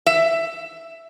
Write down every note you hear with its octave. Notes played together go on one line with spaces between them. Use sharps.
E5